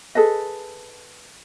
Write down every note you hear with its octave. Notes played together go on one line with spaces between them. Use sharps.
G#4 A4 B4 D#5